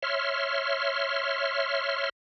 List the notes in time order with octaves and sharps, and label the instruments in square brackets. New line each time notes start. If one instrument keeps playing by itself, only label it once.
[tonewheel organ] C#5 E5 C6 F6